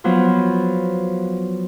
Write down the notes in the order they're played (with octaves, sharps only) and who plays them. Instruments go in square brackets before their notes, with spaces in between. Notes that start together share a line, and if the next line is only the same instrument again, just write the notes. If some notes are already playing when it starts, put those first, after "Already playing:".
[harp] F3 F#3 B3 F4